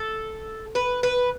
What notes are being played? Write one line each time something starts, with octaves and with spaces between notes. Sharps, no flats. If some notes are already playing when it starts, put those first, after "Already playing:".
Already playing: A4
B4
B4